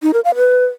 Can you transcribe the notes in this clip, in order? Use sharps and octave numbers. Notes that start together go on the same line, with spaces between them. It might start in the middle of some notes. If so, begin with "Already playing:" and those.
D#4
A#4
F5
B4